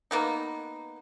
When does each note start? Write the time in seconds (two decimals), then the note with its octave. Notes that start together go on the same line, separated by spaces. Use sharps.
0.11 A#3 B3 D#4